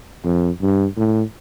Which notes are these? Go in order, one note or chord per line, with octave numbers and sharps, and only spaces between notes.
F2
G2
A2